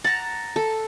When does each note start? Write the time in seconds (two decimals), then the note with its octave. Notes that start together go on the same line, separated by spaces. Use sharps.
0.04 F#5 A5 A#5
0.56 A4